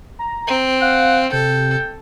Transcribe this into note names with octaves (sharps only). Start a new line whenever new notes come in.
A#5
C4
F5 F#5
C3 A4 G5